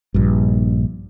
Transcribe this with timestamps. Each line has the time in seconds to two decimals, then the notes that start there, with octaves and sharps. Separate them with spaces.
0.14 A#1 G2